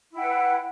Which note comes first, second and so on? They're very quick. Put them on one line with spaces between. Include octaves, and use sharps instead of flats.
E4 G5 F#5 B4